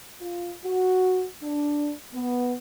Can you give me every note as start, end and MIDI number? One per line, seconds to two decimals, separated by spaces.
0.21 0.52 65
0.65 1.25 66
1.43 1.92 62
2.13 2.55 59